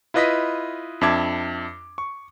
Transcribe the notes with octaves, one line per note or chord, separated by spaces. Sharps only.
E4 F4 B4 D#5 D#6 B6
F2 D4 E5 A5 D6 G#6
C#6